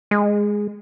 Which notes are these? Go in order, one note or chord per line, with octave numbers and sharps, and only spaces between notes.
G#3